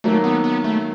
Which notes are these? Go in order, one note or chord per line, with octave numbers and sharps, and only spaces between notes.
D#3 F#3 A3 A#3
B3
B3
A3